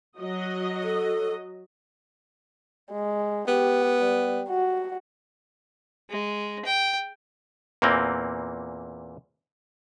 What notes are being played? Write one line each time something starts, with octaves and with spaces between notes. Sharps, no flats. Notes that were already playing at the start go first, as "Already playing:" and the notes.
F#3 D#5
A4
G#3
B3 G4
G3
F#4
G#3
G5
E2 A#2 E3 A#3 C4